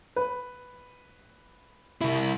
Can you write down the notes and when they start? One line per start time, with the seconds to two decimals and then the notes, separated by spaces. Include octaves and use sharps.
0.16 B4
2.01 C2 E4